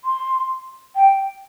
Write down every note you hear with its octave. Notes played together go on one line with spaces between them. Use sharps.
C6
G5